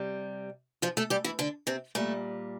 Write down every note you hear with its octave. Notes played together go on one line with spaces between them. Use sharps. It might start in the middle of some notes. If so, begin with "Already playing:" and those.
Already playing: C3 G3
F3 F4
A3 A4
G3 G4
E3 E4
D3 D4
C3 C4
A#2 G3 A3